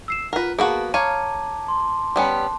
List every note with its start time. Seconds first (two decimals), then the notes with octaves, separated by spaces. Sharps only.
0.08 E6 C7 E7
0.33 F4 A#4 B4 F#5
0.59 A#3 B3 F#4 G#4 A5
0.94 C#5 F5 A5 A#5 D6 G#6 D#7
1.68 C6
2.16 G3 B3 C#4 A5